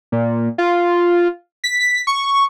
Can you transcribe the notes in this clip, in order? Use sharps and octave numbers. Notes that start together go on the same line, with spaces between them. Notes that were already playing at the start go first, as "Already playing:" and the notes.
A#2
F4
B6
C#6